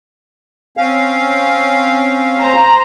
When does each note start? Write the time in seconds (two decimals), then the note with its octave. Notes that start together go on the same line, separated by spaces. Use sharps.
0.77 C4 C#4 F5
2.38 C5 A#5